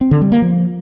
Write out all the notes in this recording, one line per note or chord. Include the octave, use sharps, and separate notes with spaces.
C4
D3
G3
A#3
F3